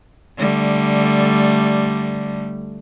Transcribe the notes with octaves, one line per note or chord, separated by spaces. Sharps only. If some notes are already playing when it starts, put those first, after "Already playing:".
D3 G3 A3